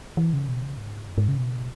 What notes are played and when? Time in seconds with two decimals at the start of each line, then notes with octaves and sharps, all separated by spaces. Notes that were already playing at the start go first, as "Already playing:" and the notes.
0.17 E3
0.33 C#3
0.48 B2
0.63 C#3
0.77 G#2
1.08 F#2
1.18 G#2
1.28 C#3
1.38 B2